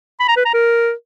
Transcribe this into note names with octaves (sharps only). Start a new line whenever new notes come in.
B5
A#5
B4
A#5
A#4